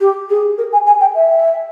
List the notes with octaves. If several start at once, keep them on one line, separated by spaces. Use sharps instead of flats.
G4
G#4
A#4
G#5
G#5
G5
E5